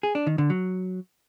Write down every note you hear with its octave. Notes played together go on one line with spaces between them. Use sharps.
G#4
D4
D#3
D3
F#3